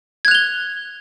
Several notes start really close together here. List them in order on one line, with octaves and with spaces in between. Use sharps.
G#6 F#6 F7 G7